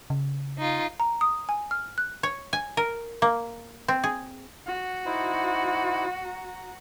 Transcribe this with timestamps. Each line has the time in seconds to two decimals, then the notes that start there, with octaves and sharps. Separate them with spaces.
0.10 C#3
0.58 D#4 F4
1.00 A#5
1.21 D#6
1.49 G#5
1.71 F6
1.98 F#6
2.23 C#5
2.53 G#5
2.77 A#4
3.22 A#3
3.88 C4
4.04 G#4
4.67 F#4
5.06 D#4 E4 C5
6.25 A#5